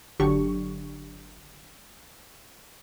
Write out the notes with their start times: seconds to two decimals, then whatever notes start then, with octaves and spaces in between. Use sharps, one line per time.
0.20 G1 D3 F#3 D4 G4 C#6